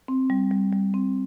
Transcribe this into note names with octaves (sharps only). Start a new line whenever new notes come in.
C4
G3
G3
G3
C4